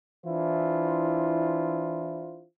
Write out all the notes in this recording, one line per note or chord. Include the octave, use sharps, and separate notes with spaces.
E3 D4 E4 F4 C5